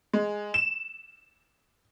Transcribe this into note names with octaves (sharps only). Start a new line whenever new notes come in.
G#3
E7